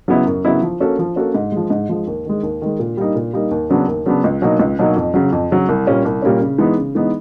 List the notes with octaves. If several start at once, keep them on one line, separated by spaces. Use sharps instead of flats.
C#3 F#3 B3 E4
F#2
C#3 F#3 B3 E4
F3
A#3 C#4 F#4 A4
F3
A#3 C#4 F#4 A4
G#2
F3 G#3
G#2
F3 G#3
D#2
D#3 G#3
D#2
D#3 G#3
A#2
G3 A#3 D#4
A#2
G3 A#3 D#4
D#2
C#3 F#3 B3 D4
D#2
C#3 F#3 B3 D4
C#2
B2 F#3 A#3 D#4
C#2
B2 F#3 A#3 D#4
F2
C#3 F#3
F2
C#3 F#3
C2
A#2 G3 A#3 C#4
C2
A#2 G3 A#3 C#4
C#3
E3 G#3 B3 D#4
C#3
E3 G#3 B3 D#4